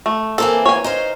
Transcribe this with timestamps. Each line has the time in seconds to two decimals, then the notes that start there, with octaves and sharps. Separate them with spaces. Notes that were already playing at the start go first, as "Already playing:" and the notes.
0.06 A3
0.38 E3 A#3 C4 A4
0.66 C#5 G#5
0.84 D#4 C5 F5